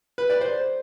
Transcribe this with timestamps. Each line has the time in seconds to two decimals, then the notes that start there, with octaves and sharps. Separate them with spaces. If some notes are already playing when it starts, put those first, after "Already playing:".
0.18 B4
0.30 D5
0.41 C5